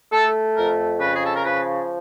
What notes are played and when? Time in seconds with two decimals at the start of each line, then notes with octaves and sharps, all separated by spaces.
0.12 A3 A4
0.56 F2 A#4
1.00 C#3 B4
1.15 G#4
1.25 A4
1.34 A#4
1.44 F3 B4